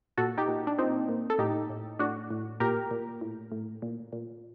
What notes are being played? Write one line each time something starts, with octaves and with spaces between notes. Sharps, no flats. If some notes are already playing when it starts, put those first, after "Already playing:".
A#2 F#4 A4
D#4 G4
A#2
D4
A#2 C4 D#4
A#2
A4
A2 D#4 G4
A2
A2 D4 F#4
A2
A#2 G4 A#4
A#2
A2
A2
A#2
A#2